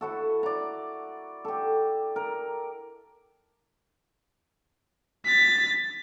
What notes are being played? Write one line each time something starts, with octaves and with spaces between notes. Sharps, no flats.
E4 F#4 A4
D5 A#5
G4 A4
A#4
A6 B6